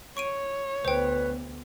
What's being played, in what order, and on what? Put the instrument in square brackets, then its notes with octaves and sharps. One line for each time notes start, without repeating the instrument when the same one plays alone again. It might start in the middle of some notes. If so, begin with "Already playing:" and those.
[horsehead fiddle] C#5 [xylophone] C#6 D7 D#7
[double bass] D2 B3 [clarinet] B4 [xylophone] C5 G5